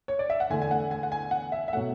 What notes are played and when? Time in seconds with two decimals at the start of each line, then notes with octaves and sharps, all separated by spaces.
0.08 C#5
0.19 D5
0.30 E5
0.40 F#5
0.50 E2 D3 A3 G#5
0.62 G#5
0.71 F#5
0.91 G#5
1.03 F#5
1.12 G#5
1.31 F#5
1.52 E5
1.68 E5
1.73 B2 F#3 A3 F#5